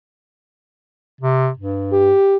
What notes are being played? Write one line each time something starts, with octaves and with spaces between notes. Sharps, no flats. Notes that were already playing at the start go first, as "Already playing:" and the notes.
C3
G2
G4